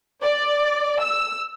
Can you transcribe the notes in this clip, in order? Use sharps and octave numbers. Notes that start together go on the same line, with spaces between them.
D5
E6